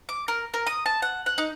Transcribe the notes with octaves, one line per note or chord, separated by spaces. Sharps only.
D6
A#4
A#4
D#6
A5
F#5
F#5
D#4